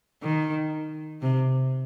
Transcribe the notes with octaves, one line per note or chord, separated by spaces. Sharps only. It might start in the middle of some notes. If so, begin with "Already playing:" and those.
D#3
C3